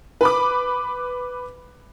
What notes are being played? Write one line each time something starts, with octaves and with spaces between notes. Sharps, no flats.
B4 B5 D6